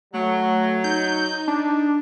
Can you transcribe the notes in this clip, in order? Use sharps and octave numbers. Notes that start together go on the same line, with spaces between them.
F#3 A3
D#4 G6
D4